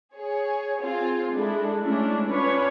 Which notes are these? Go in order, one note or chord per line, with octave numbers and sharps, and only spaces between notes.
G#4 C#5
C4 F4 G#4
G#3 D4 E4 A4
G#3 A3 C#4 D4 E4
C#4 D4 F4 B4 C#5